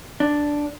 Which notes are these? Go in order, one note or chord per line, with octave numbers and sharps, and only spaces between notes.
D4